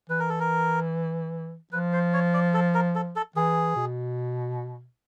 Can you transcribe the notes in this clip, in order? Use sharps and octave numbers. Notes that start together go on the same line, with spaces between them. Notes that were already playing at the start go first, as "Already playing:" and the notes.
E3 B4
A#4
A4
A#4
F3 B4
C5
C#5
D5
A4
A#4
A4
A4
E3 G#4
B2